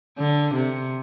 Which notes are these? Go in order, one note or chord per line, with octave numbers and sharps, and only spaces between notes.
D3
C3